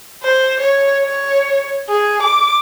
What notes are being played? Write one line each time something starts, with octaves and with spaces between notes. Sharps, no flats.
C5
C#5
C#5
G#4
D6